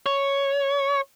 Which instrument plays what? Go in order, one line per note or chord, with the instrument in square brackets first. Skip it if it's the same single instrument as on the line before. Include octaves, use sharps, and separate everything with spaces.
[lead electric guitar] C#5